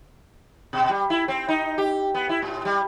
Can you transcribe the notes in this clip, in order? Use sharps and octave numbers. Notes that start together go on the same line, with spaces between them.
B2
G3
E4
C4
D#4
G4
B3
E4
A2
G3